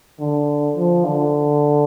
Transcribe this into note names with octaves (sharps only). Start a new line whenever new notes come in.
D3
F3
D3